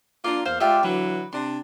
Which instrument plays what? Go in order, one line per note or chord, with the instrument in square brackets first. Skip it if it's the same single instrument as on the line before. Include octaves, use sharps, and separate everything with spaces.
[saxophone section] A#3 D4 F4 [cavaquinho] D5 A#5
[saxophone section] E2 A#3 C5 [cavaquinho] F5
[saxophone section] G#3 F4 [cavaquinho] G4 D5 E5
[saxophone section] D3 E3 F#3 [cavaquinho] B4
[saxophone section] C3 D4 [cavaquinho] C6